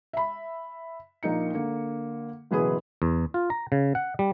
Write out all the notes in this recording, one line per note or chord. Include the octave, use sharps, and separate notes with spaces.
E5 B5
A#1 A#3 D#4 C#7
D3 A#3
F#1 B2 E3 G#4 B4 D#6
E2
F4
A#5
C#3
F#5
G3